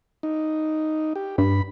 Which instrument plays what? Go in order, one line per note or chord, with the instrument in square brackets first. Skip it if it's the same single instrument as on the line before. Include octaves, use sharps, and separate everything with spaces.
[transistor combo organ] D#4
G4
[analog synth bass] G2 [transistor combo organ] B5